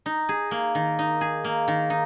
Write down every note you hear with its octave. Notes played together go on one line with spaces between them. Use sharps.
D#4
G#4
A#3
D#3
D#4
G#4
A#3
D#3
D#4